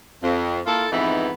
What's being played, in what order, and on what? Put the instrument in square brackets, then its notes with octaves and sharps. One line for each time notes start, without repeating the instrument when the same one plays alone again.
[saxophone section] F2
A#3 E4 F4 A4
F2 G#2 E3 B3 D#4 E4